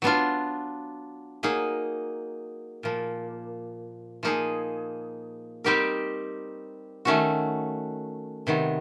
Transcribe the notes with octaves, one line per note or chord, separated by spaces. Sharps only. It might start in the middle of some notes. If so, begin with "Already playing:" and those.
F#3 B3 D4 F4
F#3 A#3 D#4 G#4
A#2 F3 A#3
F3 A#3 D#4 G#4
G3 C4 D#4 G4 A#4
D#3 F#3 A3 C#4 F#4
C3 D#3 F#3 B3